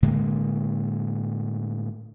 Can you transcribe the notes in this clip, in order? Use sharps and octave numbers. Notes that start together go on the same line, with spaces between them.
A2 D3 G#3 A#3